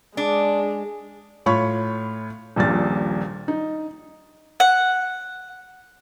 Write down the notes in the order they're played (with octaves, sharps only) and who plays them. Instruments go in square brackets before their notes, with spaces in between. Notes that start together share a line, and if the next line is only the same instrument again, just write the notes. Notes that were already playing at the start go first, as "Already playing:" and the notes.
[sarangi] G#3 [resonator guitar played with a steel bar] D4
[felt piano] A2 F4 C#5 B5 C#6
D#1 A#1 A#2 A6
D#4
[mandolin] F#5